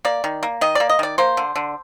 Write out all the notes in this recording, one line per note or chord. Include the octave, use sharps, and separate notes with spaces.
A#3 D5
D#3
A#3
D#3 D#5
A#3 D5
D#5
D#3 D5
A#3 C5
D3
D3